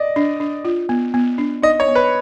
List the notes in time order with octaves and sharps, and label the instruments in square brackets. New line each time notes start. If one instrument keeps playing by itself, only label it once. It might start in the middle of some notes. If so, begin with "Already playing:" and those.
Already playing: [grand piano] D5 D#5
[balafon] D4
D4
F4
B3
B3
D4
[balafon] D#4 [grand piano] D#5
[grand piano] C#5
[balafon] B3
[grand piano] B4